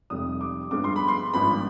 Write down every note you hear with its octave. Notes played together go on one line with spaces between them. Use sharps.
F1 F2 C3 G3 D#6
D6
G1 G2 F3 G#3 B3 D6
C6
B5
C6
G#1 G2 F3 B3 B5